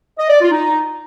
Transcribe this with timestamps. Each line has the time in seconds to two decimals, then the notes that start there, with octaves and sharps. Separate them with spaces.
0.18 D#5
0.29 D5
0.40 F4
0.51 D#4